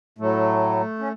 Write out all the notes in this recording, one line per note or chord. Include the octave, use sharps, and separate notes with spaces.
A2 F#3 A3
C#4